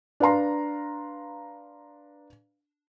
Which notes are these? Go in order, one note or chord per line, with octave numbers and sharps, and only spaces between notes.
D4 B4 F5 A#5 C6